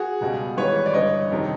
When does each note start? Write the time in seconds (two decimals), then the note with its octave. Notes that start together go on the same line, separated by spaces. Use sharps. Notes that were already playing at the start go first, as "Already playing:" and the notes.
Already playing: F#4 G#4
0.21 C#2 B2 G3
0.57 G#1 G#2 E3 G3 B4 C#5
0.86 D5
0.93 G1 G2 E3 G3 C#5 D#5
1.30 F2 C3 D#3